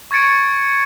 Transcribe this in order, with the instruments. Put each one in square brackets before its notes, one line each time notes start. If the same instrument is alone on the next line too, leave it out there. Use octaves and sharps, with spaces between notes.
[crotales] C#6 G#6 A6 C#7 D7